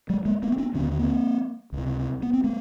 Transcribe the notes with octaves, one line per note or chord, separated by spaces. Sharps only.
F#3 G#3
G#3 A#3
A3 B3
C4
B3 C#4
D#2 D3 B3 C#4
A#3 C4
C#2 C3
B3
C4
A3 B3